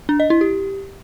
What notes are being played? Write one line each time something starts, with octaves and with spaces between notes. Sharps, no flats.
D4
D#5
E4
G4